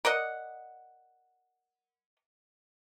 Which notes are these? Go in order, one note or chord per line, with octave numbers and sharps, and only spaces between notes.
A#4 D5 D#5 F#5